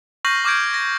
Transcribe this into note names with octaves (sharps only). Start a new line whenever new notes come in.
C#6 F6 G6 A#6 C7 F#7
C#6 D6 F6 G6 G#6 D7
A#6